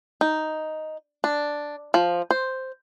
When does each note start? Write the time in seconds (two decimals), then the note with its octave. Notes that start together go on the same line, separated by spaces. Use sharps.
0.21 D#4
1.24 D4
1.94 F3
2.31 C5